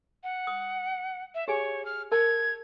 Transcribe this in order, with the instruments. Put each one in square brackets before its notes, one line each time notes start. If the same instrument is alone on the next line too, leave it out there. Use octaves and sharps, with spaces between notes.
[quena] F#5
[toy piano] D#6
[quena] E5
[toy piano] G4 G#4 G#5 [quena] C#5
[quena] F6
[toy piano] A#4 A5 [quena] G#6